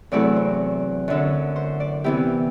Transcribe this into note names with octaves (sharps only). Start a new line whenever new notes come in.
E2 C3 F#3 A3 E4 D5
C5
F#2 D3 F#3
C5
D5
C3 E3 B3 E4 G4